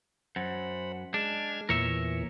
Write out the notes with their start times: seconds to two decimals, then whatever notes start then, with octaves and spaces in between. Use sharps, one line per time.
0.36 F#2 C5 F#5 B5
1.14 G#3 D4 F6 G#6
1.69 E2 A#2 E3 A#4 C#5 E5